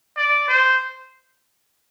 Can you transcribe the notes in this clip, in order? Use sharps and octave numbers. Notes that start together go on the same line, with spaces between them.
D5
C5